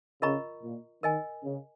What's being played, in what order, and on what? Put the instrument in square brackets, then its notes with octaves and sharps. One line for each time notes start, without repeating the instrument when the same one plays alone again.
[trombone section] C#3 [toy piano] F4 A#4 D#5 A#5 C#6
[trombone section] A#2
[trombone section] D#3 [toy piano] A#4 D#5 G#5
[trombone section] C#3